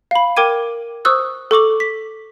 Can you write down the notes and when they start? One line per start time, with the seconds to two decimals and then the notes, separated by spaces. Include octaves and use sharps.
0.11 F5 B5
0.37 A#4 G5 D6 G#6 D#7
1.05 C5 C#6 D#6 E6 F#6
1.51 A4 C#6 D6 F#7
1.80 B6